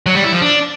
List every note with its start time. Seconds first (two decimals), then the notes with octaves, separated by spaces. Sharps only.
0.06 F#3
0.15 G3
0.24 E4
0.33 F3
0.42 D4